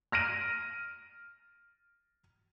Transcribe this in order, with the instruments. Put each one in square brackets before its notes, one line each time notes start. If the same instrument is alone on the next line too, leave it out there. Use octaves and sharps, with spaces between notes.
[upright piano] F6 A#6 D7 D#7